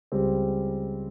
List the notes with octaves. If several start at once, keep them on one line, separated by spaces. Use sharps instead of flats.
C#2 C#3 G3 C4